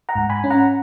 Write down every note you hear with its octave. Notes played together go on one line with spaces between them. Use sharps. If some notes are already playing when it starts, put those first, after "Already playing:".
F#5 A#5
G#2
G#5 B5
C#4
F#5 A#5